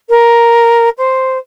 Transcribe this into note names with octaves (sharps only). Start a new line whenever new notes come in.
A#4
C5